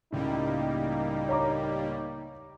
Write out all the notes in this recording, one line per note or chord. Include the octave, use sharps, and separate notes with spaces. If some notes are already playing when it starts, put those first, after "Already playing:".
C#2 A2 G3 A#3 D#4
C#5 A#5 D6